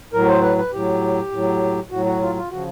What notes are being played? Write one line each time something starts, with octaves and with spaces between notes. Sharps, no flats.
A2 F#3 A#4
C5
B4
B4
A2 F#3 G4
A2 F#3
A2 F#3 F#4
F#4
F4
F4
C#3 F3 F#4